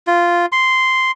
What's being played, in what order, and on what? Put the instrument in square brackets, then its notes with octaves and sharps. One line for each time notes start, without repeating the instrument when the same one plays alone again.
[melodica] F4
C6